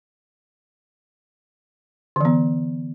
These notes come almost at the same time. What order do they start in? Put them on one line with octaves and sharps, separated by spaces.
D3 E3 B3